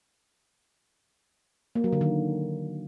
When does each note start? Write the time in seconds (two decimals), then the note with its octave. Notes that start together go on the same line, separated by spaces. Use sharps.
1.75 A#3
1.84 F#3
1.92 D3
2.01 D#3